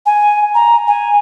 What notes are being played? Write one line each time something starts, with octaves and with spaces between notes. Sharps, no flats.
G#5
A#5
G#5